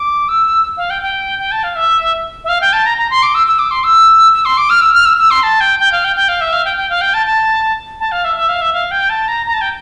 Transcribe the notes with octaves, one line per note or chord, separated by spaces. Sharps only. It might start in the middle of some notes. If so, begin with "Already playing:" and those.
Already playing: D6
E6
F5
G5
G5
G5
A5
F5
E5
E5
F5
G5
A5
A#5
A#5
C6
D6
E6
E6
D6
C6
E6
E6
C6
D6
F6
E6
F6
E6
E6
C6
A5
G5
G5
F5
G5
G5
F5
E5
F5
G5
G5
F5
G5
A5
A5
A5
F5
E5
E5
F5
E5
F5
G5
A5
A#5
A#5
A5
G5